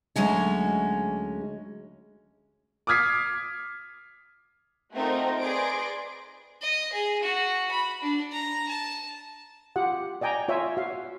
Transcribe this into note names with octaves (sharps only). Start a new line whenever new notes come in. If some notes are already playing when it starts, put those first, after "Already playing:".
D2 F#3 G#3 C#4
D6 D#6 F6 G#6 B6 C7
A3 C4 D#4 F4 F#4 A#4
G#4 B4 D5 C6 A#6 D7
D#5
G#4
F#4
B5
D4
A#5
A5
F4 G4 F#5
D5 D#5 G5 G#5 A#5
F4 C#5 E5 G#5
F#4 F5